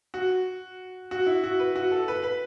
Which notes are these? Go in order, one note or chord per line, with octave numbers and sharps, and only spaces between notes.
F#4
F#4
E4
F#4
B4
F#4
A4
B4
B4